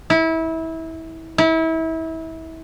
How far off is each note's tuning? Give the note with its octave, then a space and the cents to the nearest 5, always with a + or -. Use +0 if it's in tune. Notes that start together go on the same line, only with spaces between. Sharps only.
E4 -25
E4 -30